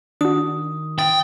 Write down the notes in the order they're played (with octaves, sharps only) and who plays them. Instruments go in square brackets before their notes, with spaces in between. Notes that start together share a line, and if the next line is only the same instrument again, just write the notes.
[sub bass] D#3 [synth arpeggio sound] D4 F#4 [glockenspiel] D#6
[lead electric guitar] G5 [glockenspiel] D#6 A6